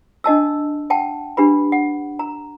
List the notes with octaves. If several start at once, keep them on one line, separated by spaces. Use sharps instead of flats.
D4 D#5 A5 E6
F#5 G5 A5
D4 G4 B4 B5
F#5
A#5